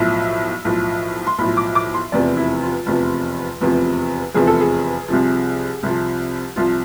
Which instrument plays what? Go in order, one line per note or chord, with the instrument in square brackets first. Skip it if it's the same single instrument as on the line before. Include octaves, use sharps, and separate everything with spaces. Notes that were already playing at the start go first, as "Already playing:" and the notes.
Already playing: [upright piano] B1 A2 F3 E5
B1 A2 F3
C6
B1 A2 F3 B5
D6
D6
C6
F1 E2 C3 F3 D5
E4
F4
F1 E2 C3 F3
F1 E2 C3 F3
F1 E2 C3 F3 G#4
A4
G#4
C2 C3 F3
C2 C3 F3
C2 C3 F3 F4